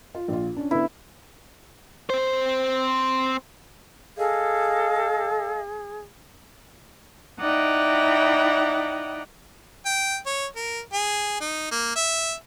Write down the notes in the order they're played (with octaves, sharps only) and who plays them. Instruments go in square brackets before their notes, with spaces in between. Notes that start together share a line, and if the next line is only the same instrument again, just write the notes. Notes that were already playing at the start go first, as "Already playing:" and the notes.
[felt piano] F4
A#1 F4
C#4 D4
[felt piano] D3 B3 [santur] E4
[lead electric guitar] C4 C5
[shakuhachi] G#4 [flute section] A4 D#5 F5
[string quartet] D#4 E4 D5 F#5 G5 A#5
[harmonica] G5
C#5
A#4
G#4
D#4
A#3
E5